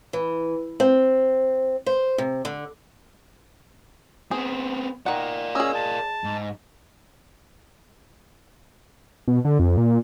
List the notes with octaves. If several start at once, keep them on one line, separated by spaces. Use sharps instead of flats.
E3
C4
C5
C3
D3
B3 C4 G#4
D#3 A#4 D5 F#5
C#4 G#4 D#5 E6
A5
G#2
B2
D3
F2
A#2